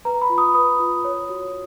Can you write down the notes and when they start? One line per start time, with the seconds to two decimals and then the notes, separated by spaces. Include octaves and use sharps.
0.05 B4 A#5
0.21 B5
0.30 F4
0.38 D#6
0.55 B4 D#6
0.80 F4
1.05 C#5
1.29 F#4